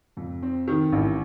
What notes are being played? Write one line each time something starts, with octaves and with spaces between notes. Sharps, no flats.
F2
C4
D#3
A1